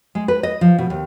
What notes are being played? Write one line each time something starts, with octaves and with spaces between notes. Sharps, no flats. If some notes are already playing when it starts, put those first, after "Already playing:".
G#3
B4
D#5
F3
B2
D#2